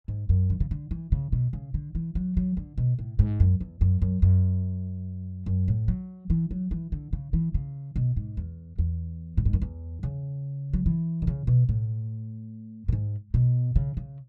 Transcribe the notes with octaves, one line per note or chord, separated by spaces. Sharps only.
G#2
F#2
D3
C#3
D3
E3
C#3
B2
C#3
D3
E3
F#3
F#3
D3
B2
A2
G#2
F#2
E2
F#2
F#2
F#2
F#2
A2
F#3
E3
F#3
E3
D3
C#3
E3
C#3
B2
G#2
E2
E2
A2
G#2
F#2
E2
C#3
F#3
E3
D3
C#3
B2
A2
A2
G#2
B2
C#3
C#3